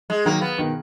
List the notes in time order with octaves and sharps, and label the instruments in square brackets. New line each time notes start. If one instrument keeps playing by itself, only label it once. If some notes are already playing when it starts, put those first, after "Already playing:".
[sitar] G#3
[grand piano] D#3 F#3 [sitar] A#3
[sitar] B3
[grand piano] B2 D#3